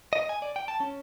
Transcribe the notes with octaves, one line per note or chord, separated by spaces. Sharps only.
D#5
G#5
D5
G5
A5
C#4